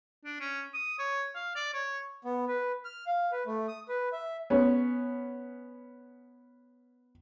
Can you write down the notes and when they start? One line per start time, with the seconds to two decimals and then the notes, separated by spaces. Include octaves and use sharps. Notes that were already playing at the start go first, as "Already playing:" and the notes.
0.25 D4
0.40 C#4
0.74 D#6
0.99 C#5
1.35 F5
1.55 D5
1.73 C#5
2.25 B3
2.48 B4
2.85 F6
3.07 F5
3.32 B4
3.46 A3
3.68 D#6
3.89 B4
4.12 E5
4.50 B3 C#4